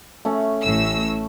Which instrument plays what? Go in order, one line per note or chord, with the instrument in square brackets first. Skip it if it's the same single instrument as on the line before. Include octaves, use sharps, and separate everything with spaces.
[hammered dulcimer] A3 C#4
[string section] A1 A2 E6